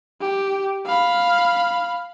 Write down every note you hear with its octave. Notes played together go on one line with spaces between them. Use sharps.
G4
F5 B5